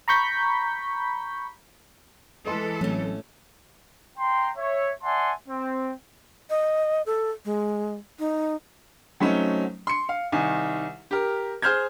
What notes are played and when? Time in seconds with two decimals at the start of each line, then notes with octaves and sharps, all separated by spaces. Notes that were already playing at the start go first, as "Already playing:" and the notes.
0.08 A#5 B5 C#6 G6 B6
2.46 E3 G#3 A4 B4 D#5 C6
2.81 A1 F#3 A3 C4 C#4
4.18 G5 A#5 C6
4.57 C#5 E5
5.03 D5 E5 F#5 G#5 A5 C6
5.48 C4
6.50 D#5
7.06 A4
7.45 G#3
8.19 D#4
9.20 F#3 A3 C4 C#4 D#4
9.87 C6 C#7
10.09 F5
10.32 C2 D#3 G#5
11.11 G4 A#4
11.62 G#4 C5 F6 G6 G#6